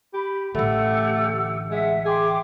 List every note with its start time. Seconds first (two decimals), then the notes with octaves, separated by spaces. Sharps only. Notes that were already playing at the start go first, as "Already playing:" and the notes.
0.14 G4 B5
0.55 A1 D3 A3 G4 F#5 E6
1.70 G#3 E5 F#5
2.05 G#4 G5 C6 D6